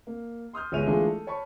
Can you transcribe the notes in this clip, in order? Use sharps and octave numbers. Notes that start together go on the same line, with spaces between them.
A#3
C6 D#6 F6 G6
G1 G#3 C#5 E5 D#7 F7
E3 G#3 A3 D4 F4 G#4
A4
C#5 A5 B5 C#6